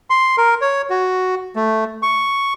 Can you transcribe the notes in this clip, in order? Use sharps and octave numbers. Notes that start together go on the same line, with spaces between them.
C6
A#4
C#5
F#4
A3
C#6